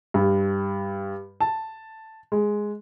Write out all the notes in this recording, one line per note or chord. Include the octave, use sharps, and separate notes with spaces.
G2
A5
G#3